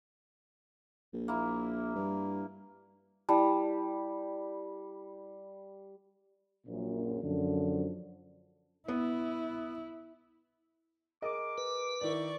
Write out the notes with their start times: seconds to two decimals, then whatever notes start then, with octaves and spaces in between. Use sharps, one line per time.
1.13 A#1
1.28 A#3 E4
1.95 G2
3.29 G3 E4 A5
6.66 A#1 F#2 A#2
7.21 F#2 D3 F3
8.88 B3 E4
11.22 G#4 A#4 D#5 D6
11.58 B4
12.01 D#3 E4 D5 C#6